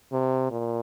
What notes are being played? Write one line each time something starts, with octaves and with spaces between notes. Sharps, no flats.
C3
A#2